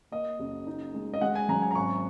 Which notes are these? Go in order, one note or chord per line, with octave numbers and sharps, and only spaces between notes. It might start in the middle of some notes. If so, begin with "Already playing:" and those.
A#3 D#5
F#1
D#4
G#3
D#5
G#3 F#5
G#5
F#2 A#5
G#5
A#5
G#1 C#6